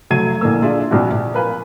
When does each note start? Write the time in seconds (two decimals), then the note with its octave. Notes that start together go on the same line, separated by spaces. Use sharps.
0.10 F1 F#3 A3 A4 G#6 D#7
0.41 A#1 A2 D3 A#3 E6
0.62 D4 F4 G#4 E5
0.91 A#1 C3 G3 F#4
1.12 A#1
1.34 A#4 B4 F5 G#5